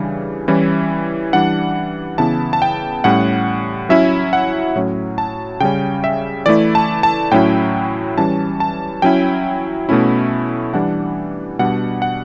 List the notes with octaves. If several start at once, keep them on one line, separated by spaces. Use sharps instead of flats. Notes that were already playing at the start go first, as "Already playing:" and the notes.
Already playing: C#3 E3 G3 D4
E3 G3 C#4 E4
E3 G3 D4 F#5
C#3 E3 B3 E4 A5
A5
G5
A2 G3 C#4 F#5
F#3 C#4 E4 E5
F#5
A2 F#3 C#4
A5
C#3 G3 C#4 G5
E5
E3 A3 E4 D5
A5
A5
A2 F#3 C#4 E4 G5
E3 G3 C#4 A5
A5
F#3 C#4 E4 G5
B2 A3 C#4 E4
E3 G3 D4 F#5
B2 G3 D4 F#5
F#5